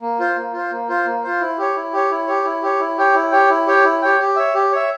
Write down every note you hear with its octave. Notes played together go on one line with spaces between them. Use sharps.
A#3
F4 C5
A#3
F4 C5
A#3
F4 C5
A#3
F4 C5
E4
G4 C#5
E4
G4 C#5
E4
G4 C#5
E4
G4 C#5
E4
G4 C#5 G5
E4
G4 C#5 G5
E4
G4 C#5 G5
E4
G4 C#5 G5
G4
C#5 E5
G4
C#5 E5